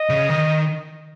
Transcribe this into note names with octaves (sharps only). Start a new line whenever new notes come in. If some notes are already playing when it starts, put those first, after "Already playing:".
Already playing: D#5
C#3
D#3